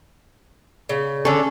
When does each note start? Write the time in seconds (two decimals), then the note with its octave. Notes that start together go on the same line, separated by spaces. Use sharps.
0.89 C#3
1.25 D3 C#4 A4